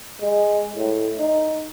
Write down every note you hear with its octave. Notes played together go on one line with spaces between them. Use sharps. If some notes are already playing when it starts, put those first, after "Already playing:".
G#3
A2
D#4